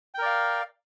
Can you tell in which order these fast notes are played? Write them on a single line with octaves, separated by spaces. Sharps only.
G5 A#4 D5 F5